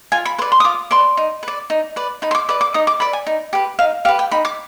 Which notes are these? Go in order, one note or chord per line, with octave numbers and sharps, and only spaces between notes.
F4 G#5
B5
B4 D5 C6
C6
D#6
F4 D6
B4 D5 C6
D#4
B4 D5
D#4
B4 D5
D#4 B5
C6
D6
B4 D5 D6
D6
D#4 D#6
D6
B4 D5 B5
G#5
D#4
G4 B4
D#4 F5
G4 B4 F5
G5
D#4 B5
D6